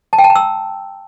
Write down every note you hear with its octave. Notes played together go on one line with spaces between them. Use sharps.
A5
G5
A5
A#5
E6